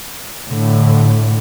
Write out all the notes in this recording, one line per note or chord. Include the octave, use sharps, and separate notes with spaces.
A2 D3